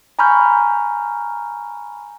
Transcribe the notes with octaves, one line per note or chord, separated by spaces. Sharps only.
G#5 A#5 B5 C#6 F6 G6